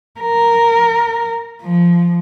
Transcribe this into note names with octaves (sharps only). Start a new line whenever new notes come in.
A#4
F3